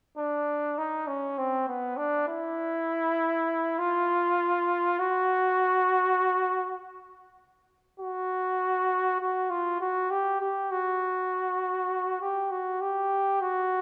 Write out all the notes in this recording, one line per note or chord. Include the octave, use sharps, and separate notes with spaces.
D4
D#4
C#4
C4
B3
D4
E4
F4
F#4
F#4
F#4
F4
F#4
G4
G4
F#4
G4
F#4
G4
F#4